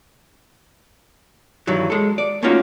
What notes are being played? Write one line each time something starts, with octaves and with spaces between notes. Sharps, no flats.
G2 D#3 E3 F#3
G#3 A4
D5
A3 A#3 C#4 D#4 F4 F#4